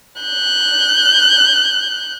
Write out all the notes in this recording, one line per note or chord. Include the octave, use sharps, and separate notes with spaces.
F#6 G6